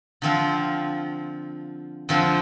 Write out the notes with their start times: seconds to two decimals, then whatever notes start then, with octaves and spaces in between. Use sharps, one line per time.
0.22 D3 F3 C4 F4
2.09 F2 D3 F3 C4 F4